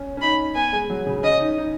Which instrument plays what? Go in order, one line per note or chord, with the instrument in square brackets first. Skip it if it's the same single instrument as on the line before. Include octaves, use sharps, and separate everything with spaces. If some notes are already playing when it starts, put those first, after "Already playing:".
Already playing: [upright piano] C#4
C#4
[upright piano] D#4 [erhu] B5
[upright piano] B3 [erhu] G#5
[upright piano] G#3
F#3
C#3
[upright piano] C#4 [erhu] D#5
[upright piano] D#4
D#4